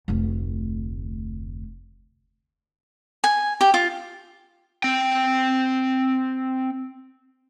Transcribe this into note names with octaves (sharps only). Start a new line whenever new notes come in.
F1 D2
G#5
G4
F4
C4 G5